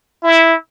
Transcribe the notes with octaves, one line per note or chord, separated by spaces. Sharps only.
E4